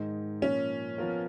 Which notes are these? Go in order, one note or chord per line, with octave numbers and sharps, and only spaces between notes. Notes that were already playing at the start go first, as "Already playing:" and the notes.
Already playing: G#2 D#3 G#3 D#4
A#2 F3 A#3 C#4
F3 B3 F4 A#4